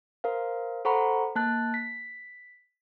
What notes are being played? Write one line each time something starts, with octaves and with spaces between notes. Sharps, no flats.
A#4 C5 F5
A4 C5 F#5 A#5 B5 C#6
A#3 A5 F#6 A6
B6